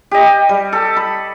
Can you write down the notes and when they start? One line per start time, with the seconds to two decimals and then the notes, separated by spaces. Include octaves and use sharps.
0.11 G4 D#5
0.49 G3
0.73 A4
0.96 B5